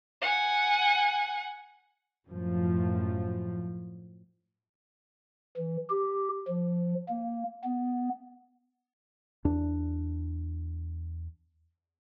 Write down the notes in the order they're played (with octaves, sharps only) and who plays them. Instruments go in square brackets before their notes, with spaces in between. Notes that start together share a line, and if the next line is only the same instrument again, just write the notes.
[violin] F#5 G#5
[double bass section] F#2 A2 F3
[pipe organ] E3
G4
F3
A#3
B3
[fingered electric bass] E2 D4